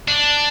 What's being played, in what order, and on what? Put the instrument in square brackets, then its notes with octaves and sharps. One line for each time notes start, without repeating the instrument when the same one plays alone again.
[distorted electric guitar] D4